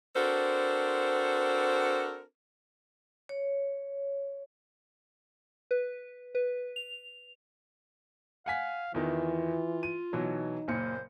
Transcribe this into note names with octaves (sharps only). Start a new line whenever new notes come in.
C4 D4 F#4 A4 A#4 C5
C#5
B4
B4
F7
F5 F#5 G#5 B6
E2 D#3 E3 F4
D#7
B2 E3 F#3 D#4
F#1 A#2 C5 C#7